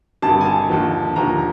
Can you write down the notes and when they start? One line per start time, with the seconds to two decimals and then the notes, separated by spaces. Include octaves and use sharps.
0.22 G#1 G2 D3 A5
0.41 G#5
0.45 A5
0.69 D#2 D3 F3
1.16 D#2 D3 F3 A#5